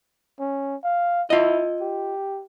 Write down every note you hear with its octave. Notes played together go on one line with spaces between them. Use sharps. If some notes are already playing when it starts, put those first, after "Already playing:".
C#4
F5
E4 F4 D#5
G4